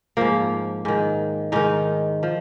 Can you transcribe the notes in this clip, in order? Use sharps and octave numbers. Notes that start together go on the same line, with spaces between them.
G#2 F3 A#3
G#2 D#3
G#2 D#3 D#4
F3